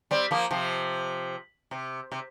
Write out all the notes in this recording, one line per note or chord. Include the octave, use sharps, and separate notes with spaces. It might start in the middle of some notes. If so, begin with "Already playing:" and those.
G3 C4
F3 A#3
C3 F3
C3
C3